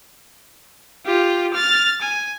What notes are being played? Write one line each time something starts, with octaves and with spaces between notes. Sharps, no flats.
F4 G4
F6 A6
G#5